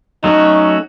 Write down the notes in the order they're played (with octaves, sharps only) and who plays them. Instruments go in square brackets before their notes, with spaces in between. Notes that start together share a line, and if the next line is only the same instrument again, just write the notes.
[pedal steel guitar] F#3 A3 C#4 F#4 [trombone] D#4